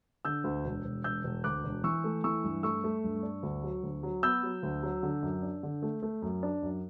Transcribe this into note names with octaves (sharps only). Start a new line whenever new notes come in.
D3 E6 G6
D2
E1
E1
E1 E6 G6
E1
D2 D6 F#6
E1
E3 C#6 E6
A3
E3 C#6 E6
G2
A3 C#6 E6
A3
G2
D4
D2
F#3
D2
F#3
B3 E6 G6
F#3
D2
F#3
D3
F#2
D4
D3
A3
A3
F#2
D4
F#2